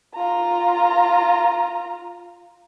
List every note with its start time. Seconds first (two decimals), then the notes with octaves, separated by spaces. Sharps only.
0.14 F4 A#5